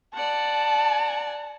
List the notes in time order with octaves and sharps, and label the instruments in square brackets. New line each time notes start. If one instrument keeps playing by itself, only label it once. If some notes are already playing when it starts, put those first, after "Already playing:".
[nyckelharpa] D5 F#5 [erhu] A5